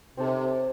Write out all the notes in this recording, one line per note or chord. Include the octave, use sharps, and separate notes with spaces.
C3 C4 D#4 A4 C#5